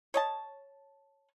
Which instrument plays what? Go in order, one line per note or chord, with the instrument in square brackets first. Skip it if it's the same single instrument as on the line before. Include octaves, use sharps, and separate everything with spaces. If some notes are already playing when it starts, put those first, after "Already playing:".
[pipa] C#5 D#5 A5